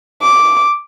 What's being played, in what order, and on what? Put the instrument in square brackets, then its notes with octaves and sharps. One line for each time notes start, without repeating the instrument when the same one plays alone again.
[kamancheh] D6